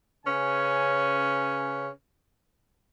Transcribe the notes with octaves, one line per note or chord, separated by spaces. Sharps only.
C#3 C#4 B4 G#5